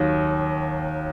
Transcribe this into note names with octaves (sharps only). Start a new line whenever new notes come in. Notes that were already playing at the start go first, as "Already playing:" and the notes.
Already playing: D#2 D#3 F#3